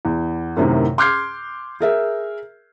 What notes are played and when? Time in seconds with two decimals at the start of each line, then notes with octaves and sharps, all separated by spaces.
0.05 E2
0.57 F#2 A2 C3 D#3
0.98 C6 D6 F6 G6 G#6 C7
1.80 G#4 A#4 E5